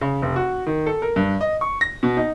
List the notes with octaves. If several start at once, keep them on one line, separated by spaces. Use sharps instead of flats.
C#3
F1
F#4
D#3
A4
A#4
G2
D#5
C#6
A#6
B2
D#4